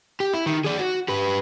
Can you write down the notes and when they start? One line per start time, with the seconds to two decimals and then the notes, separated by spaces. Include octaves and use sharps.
0.20 G4
0.34 E4
0.46 D#3
0.65 G#4 D5
0.79 F#4
1.08 G4 B4